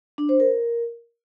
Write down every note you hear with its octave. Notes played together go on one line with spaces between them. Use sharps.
D4
C5
A#4